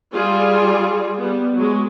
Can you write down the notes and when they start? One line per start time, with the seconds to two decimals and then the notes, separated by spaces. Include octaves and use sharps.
0.13 G3 F4 G#4
1.19 G3 B3
1.56 F#3 G#3